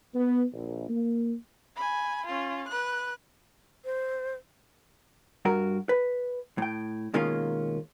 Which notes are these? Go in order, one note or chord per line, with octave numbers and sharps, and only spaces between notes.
B3
A#1
A#3
G#5 B5
C#4 F4
B4 F#6
C5
G2 F#4 A#4
B4
A2 G5
B2 D#3 G#3 A#3 C#4 F4